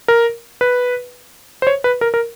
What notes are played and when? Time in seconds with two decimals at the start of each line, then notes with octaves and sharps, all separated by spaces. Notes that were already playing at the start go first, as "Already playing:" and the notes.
0.08 A#4
0.61 B4
1.62 C5
1.67 C#5
1.84 B4
2.01 A#4
2.14 A#4